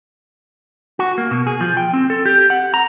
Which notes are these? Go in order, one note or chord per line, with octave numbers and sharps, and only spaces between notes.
F#4
A#3
B2
G#4
F3
G5
C4
A4
G4
F#5
A#5